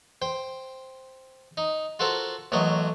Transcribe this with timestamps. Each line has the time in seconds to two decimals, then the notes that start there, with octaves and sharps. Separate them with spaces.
0.22 C5 G5
1.57 D#4
1.99 F4 F#4 A4 A#4 C5
2.52 A1 F#3 A3 A#4 D#5